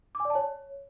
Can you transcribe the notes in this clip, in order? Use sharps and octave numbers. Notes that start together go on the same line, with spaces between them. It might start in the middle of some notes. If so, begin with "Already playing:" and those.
D6
G#5
D5
A5
C#5